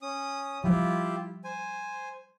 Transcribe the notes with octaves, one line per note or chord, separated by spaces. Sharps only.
C#4 D#6
F3 G3 E4 F4 G4
C5 G#5